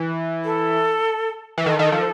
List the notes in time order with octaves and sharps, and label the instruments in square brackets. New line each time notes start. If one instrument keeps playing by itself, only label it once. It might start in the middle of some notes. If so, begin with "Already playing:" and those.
Already playing: [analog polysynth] E3
[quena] A4
[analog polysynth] E3
[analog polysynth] D#3 [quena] A4
[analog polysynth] D#3
F3